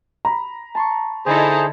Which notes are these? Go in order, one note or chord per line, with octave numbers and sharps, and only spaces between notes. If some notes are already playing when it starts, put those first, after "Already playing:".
A#5 B5
A5 C6 C#6
D3 D#4 E4 G#4 A4 C5